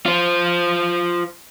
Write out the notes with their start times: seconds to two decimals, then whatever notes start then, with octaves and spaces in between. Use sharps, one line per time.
0.06 F4 C5